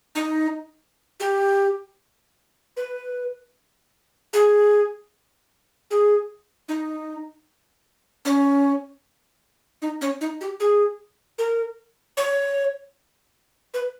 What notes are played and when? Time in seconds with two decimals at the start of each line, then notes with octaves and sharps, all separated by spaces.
0.15 D#4
1.20 G4
2.77 B4
4.33 G#4
5.91 G#4
6.69 D#4
8.25 C#4
9.82 D#4
10.01 C#4
10.21 D#4
10.41 G4
10.60 G#4
11.38 A#4
12.17 C#5
13.74 B4